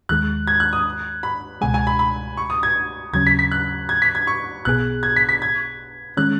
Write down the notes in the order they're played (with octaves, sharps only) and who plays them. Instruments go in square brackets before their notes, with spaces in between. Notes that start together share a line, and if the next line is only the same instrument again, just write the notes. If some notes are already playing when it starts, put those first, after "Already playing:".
[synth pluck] D#2 D#3 G#3 [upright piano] F#6
[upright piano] G#6
F#6
D#6
B5
[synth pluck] C#2 B2 G#3 [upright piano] G#5
[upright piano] G#5
B5
B5
C#6
D#6
G#6
[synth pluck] D#2 C#3 F#3 C#4 [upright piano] G#6
[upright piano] B6
B6
F#6
G#6
B6
G#6
C#6
[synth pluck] B1 B2 B3 G#4 [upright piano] F#6
[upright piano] G#6
B6
B6
G#6
[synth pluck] D#3 G#3 C#4 [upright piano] F#6